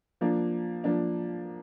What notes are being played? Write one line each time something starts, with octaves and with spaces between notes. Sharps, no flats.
F3 A#3 D4
F3 A#3 D4